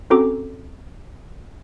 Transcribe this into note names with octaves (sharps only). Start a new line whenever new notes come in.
C4 C#4 F#4 A4 A#5 D6